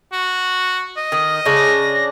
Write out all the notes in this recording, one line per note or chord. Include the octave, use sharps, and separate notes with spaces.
F#4
D#5
D#3 D#6
C#3 D4 A#6